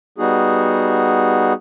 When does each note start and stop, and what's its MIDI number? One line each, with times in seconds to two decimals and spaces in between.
0.18 1.53 55
0.18 1.53 59
0.18 1.53 63
0.18 1.53 66
0.18 1.53 68